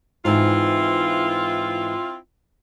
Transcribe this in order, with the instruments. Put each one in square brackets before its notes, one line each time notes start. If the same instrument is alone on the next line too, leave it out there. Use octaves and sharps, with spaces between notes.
[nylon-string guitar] G#2 E3 [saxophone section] C4 E4 F4